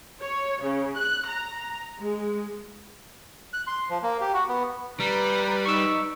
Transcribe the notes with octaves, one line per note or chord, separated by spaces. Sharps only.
C#5
C#3
F#6
A#5
G#3
F#6
C6
F3
A#3
G4
F#4
B3
G3 B4 A#5
D#4 C#6 E6